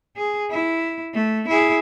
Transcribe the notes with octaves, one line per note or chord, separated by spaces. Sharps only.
G#4
E4
A3
E4 G#4